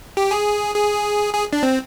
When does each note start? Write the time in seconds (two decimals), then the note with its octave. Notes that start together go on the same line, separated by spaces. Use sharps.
0.17 G4
0.31 G#4
0.75 G#4
1.34 G#4
1.53 D4
1.63 C4